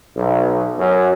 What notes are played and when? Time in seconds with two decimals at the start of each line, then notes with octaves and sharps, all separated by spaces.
0.18 B1
0.79 F#2